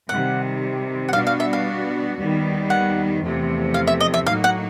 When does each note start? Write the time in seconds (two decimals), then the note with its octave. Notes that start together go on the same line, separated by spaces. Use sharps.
0.09 C3 D#3 G3 F#5
1.08 F#5
1.13 B2 G3 B3 D4 F#4 F5
1.27 F5
1.40 E5
1.53 F5
2.18 D#2 D#3 G3 B3
2.70 F#5
3.22 E2 C3 F3 A3
3.74 F5
3.87 E5
4.00 D#5
4.14 E5
4.26 A2 F#3 A#3 D#4 F#4 F5
4.44 F#5